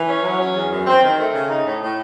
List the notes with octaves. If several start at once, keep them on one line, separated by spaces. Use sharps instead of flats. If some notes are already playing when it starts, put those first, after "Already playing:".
Already playing: E3
C#4
F#3
C#4
E2
F#2
C4
D#3
A3
C#3
D#4
A2
A2